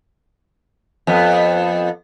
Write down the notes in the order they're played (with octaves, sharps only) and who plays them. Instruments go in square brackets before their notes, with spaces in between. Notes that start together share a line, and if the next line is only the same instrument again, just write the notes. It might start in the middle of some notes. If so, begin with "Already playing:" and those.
[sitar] F2 B3